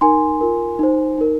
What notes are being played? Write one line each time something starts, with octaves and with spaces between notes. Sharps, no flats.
D#4 A#4 G#5 C6
F4 A#4
D#4 C5
D#4 A#4